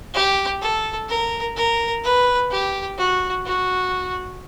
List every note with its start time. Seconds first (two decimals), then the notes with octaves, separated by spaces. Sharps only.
0.14 G4
0.62 A4
1.09 A#4
1.56 A#4
2.04 B4
2.51 G4
2.98 F#4
3.46 F#4